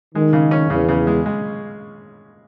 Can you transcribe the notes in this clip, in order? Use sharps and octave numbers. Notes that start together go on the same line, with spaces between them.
D#3 G#3
C#3
C#4
E2 C#3
C#3
G#3
G#3